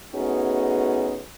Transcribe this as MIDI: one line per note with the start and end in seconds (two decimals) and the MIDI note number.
0.15 1.21 57
0.15 1.21 59
0.15 1.21 61
0.15 1.21 63
0.15 1.21 66
0.15 1.21 68